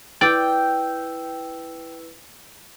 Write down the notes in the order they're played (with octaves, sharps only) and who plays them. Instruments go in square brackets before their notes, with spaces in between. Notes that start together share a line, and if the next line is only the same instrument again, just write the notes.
[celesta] E4 B4 E6 [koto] D5 [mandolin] G5